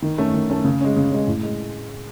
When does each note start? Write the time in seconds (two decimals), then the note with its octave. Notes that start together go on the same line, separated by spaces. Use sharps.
0.02 D#3
0.18 A3 C#4
0.34 D#3
0.49 A3 C#4
0.64 C#3
0.81 G#3 C#4
0.96 C#3
1.11 G#3 C#4
1.27 A2
1.43 G#3